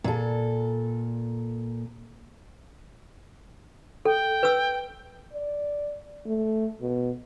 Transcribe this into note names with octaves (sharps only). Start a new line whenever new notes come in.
A#2 A4
A4 G5
B4 E6
D5
A3
B2